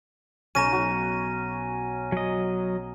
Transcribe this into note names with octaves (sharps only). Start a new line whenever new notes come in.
B1 C#4 A#5 A#6 D#7
F#4
F#3 D#5